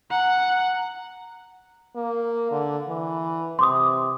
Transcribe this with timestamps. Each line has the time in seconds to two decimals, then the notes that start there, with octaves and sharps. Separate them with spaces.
0.11 F#5 A#5
1.96 A#3
2.51 D3
2.88 E3
3.59 C3 C6 D6 D#6